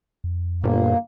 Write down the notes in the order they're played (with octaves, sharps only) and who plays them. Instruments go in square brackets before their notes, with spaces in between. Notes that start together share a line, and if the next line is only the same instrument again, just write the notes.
[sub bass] F2
[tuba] G1 [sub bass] F#2 [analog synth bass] A#2 [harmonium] A#3